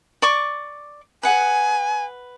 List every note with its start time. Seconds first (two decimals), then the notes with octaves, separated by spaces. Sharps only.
0.22 D5 C#6 D6
1.23 B4 F#5 G#5